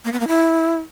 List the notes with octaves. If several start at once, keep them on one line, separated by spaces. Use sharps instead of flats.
A#3
B3
A#3
E4